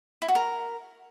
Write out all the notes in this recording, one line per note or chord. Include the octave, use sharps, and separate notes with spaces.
E4
F#4
A#4